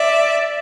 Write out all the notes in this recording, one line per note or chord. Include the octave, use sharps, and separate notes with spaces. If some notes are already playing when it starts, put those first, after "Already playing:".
Already playing: D5 E5